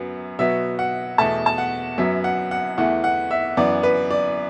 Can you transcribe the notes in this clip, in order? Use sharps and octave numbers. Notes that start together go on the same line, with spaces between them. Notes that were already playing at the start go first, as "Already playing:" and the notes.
Already playing: F#2 F#3 B3
B2 F#3 B3 E5
F#5
E2 B2 A3 A5
A5
F#5
F#2 F#3 B3 E5
F#5
F#5
E2 E3 A3 F#5
F#5
E5
F#2 E3 B3 D5
B4
D5